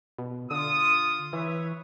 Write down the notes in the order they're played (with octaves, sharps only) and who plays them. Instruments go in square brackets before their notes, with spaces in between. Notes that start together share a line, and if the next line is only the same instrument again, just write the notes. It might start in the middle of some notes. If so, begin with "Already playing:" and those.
[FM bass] B2
[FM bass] D3 [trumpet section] F4 D#6
[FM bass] E3 [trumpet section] B4 C#5 E5